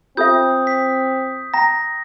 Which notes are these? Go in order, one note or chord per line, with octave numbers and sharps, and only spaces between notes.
C4 F4 A4 E5 D#6 G6
B6
G5 A#5 A#6